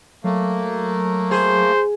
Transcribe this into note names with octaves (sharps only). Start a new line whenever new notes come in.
F#3 A3 A#3
G#4 C5